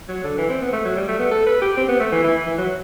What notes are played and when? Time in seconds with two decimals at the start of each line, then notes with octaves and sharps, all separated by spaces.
0.08 F#3
0.23 D3
0.38 E3
0.49 C4
0.61 B3
0.72 A3
0.85 F#3
0.96 G3
1.08 A3
1.19 B3
1.31 A4
1.46 B4
1.61 G4
1.77 C4
1.88 B3
2.00 A3
2.12 E3
2.24 E3
2.46 E3
2.58 F#3